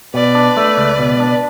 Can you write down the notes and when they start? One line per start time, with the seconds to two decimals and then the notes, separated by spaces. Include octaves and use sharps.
0.14 B2 B4 D5
0.35 D4
0.57 A3
0.77 C#2
0.99 B2
1.20 D4